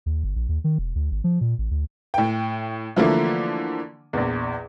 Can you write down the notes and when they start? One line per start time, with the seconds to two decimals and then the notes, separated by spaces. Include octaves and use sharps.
0.06 D#2
0.24 G1
0.36 A#1
0.49 D#2
0.64 D#3
0.78 E1
0.95 D2
1.11 G#1
1.24 F3
1.41 A#2
1.58 A1
1.71 D2
2.14 A2 G5
2.96 D3 E3 F3 A3 A#3
4.13 A#1 E2